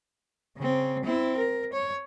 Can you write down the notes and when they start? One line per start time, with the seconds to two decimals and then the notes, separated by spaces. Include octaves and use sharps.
0.58 C#3 C4
1.04 C4 E4
1.37 A#4
1.73 C#5